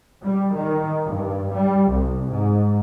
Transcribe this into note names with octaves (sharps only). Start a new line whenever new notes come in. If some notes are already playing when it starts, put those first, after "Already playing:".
G3
D#3
G2
G3
C2
G#2